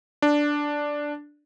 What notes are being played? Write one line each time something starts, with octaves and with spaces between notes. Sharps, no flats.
D4